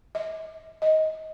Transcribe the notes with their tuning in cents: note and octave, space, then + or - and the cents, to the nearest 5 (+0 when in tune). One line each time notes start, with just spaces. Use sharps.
D#5 +45
D#5 +15